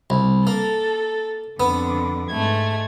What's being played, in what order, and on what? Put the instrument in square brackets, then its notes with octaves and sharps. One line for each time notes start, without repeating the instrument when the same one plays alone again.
[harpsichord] C2
[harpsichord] A#3 [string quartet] A4
[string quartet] F2 D3 [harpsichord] B3
[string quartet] G#2 A3 G#6